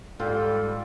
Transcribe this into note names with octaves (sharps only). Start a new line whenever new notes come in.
G#2 G3 F4 A4 G5